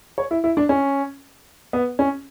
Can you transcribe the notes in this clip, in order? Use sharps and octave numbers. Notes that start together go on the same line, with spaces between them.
C#5
E4
E4
D4
C#4
B3
C#4